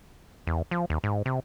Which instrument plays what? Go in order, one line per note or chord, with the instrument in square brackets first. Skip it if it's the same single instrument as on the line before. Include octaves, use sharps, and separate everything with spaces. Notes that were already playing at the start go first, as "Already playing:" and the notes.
[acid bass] E2
F3
D#2
G#2
C3